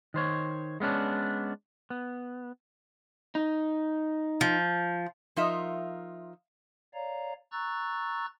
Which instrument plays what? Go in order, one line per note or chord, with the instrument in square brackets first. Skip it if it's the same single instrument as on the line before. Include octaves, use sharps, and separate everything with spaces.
[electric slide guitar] D#3 C5 C#5
G#3 B3 C#4 D4
B3
[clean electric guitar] D#4
[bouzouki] F3
[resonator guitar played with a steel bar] F3 D#4 F4 A#4 E5
[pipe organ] C#5 D5 F5 A#5
A#5 C#6 E6 F#6 A6